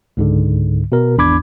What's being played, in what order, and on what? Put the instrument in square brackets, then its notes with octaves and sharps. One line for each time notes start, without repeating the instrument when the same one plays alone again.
[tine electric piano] C#2 G#2 D3
B2 A#4
G#1 E2 D4 B5 D6 G#6